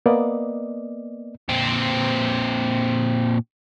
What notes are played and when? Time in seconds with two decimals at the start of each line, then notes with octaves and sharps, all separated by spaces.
0.06 A#3 B3 D5 D#5
1.49 A#2 C4